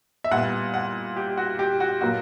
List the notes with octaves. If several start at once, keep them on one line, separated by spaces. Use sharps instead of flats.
E5
A#2 G3 B3 F#5
F#5
G4
F#4
G4
F#4
A#2 F#3 A#3 F#4